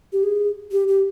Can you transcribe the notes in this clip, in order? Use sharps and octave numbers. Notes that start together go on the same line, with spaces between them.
G4
G#4
G4
G4